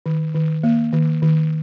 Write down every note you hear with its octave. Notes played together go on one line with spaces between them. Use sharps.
D#3
D#3
A#3
D#3
D#3